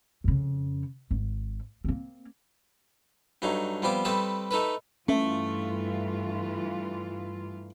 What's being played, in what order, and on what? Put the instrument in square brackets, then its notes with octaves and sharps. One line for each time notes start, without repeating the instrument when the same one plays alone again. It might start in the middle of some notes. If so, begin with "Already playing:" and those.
[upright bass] F2 C#3
G#1
A#3 C4
[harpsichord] G2 F#3 A3 D#4
F3 G3 B3 C4 C6 D6
G3 A3 C4 B4 A5 D#6
A3 D#4 A4 B4
[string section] G2 E3 F4 [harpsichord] A3 [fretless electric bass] C#4